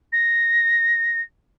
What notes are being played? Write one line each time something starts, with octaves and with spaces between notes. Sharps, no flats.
A#6